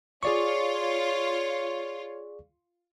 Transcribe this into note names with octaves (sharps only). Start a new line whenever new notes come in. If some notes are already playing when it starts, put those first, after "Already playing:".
F4 G#4 C#5 D5 C#6